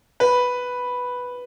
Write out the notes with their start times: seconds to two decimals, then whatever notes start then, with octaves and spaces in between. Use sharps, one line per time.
0.20 B4